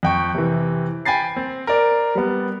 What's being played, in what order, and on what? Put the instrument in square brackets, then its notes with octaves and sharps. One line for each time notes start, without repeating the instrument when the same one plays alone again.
[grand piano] F2 G5 C#6
C3 E3
G5 G#5 B5 A6 C7
C4
A#4 D5
G3 B3